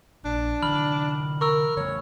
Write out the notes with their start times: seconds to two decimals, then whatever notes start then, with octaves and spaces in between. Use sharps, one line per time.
0.25 A#1 D4
0.62 D3 E3 B5 F6 F#7
1.41 A#4 C#6 E6
1.77 C#3 E3 A3 C#5